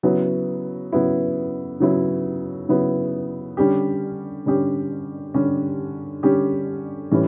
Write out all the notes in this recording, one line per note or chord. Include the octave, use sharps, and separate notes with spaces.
C#3 F#3 B3 E4
C#3 F#3 B3 E4
C#3 F#3 B3 E4
C#3 F#3 B3 E4
D3 G3 C#4 G4
D3 G3 C#4 G4
D3 G3 C#4 G4
D3 G3 C#4 G4
A2 E3 G3 C#4